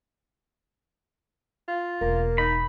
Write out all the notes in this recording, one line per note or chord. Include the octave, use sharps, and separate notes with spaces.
F4
E1 A#3
D#4 B5